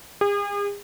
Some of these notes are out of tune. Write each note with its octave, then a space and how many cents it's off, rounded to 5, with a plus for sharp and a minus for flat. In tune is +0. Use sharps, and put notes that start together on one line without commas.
G#4 -40